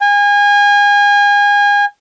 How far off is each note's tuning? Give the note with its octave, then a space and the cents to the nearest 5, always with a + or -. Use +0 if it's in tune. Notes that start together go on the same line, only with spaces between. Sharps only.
G#5 -30